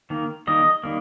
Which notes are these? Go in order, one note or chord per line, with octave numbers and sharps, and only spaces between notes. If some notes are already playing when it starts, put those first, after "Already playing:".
D#3 A#3
D#3 G3 A#3 D#5
D#3 G3 A#3